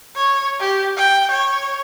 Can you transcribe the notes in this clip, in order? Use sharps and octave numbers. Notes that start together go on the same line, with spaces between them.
C#5
G4
G5
C#5